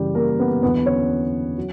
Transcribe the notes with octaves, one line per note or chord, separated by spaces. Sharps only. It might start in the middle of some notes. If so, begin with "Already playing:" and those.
Already playing: F#2 C#3 E3 G3 G4
A#3 A#4
B3 B4
E2 D3 F#3 B3 B4
C#4 C#5
F#3